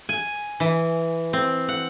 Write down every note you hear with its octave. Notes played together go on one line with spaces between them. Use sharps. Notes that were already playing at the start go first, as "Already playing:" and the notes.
G#5
E3
C4
F#5